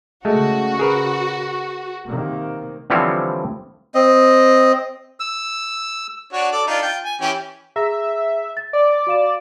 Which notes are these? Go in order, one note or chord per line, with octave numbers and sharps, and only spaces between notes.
C#3 G#3 A3 C#4 F#4
G#4 A#4 B4
C3 D#3 A#3
D3 E3 F3 G3 C4 C#5
C4 D#5
E6
D4 F#4 C#5
A4 D5
D4 D#4 F4
F4 G5
G#5
E3 C#4 G4
G#4 E5 A#5 A#6
A6
D5
F#4 F5 E7